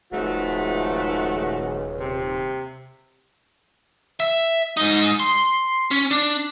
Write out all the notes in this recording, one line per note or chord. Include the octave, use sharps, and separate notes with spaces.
D#1 C#2 G#2 F3 A3 F#4
C3
E5
G#2 D#4
C6
C#4
D4